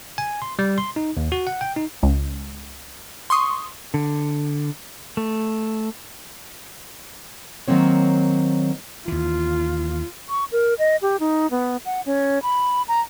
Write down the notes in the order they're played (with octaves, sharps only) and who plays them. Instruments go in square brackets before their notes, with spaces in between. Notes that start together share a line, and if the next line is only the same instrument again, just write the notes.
[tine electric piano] G#5
C6
G3
C6
D#4
D#2
F#4
F#5
G5
D#4
[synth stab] C#2
C6 C#6 D#6
[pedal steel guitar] D3
A3
[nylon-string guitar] D#3 F#3 A#3 C4 C#5
[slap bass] D#2 E3 [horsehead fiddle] F4
[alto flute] C#6
A#4
D#5
G4
D#4
B3
F#5
C#4
B5
A#5